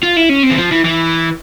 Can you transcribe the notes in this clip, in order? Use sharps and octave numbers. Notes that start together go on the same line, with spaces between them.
F4
E4
C#4
C4
E3
F3
E3
E3